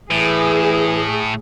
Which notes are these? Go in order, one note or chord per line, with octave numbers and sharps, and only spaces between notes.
A2 E3 G#4